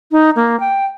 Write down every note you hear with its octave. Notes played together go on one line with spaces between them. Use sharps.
D#4
A#3
G5